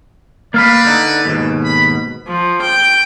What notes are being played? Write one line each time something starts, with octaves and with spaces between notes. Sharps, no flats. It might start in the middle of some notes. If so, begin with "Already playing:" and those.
A#3 B4 D5 F5 B5
D3 D#4
D#2 G#2 B2
B5
F3
G5